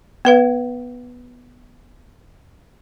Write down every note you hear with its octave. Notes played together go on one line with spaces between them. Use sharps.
B3 B4 F5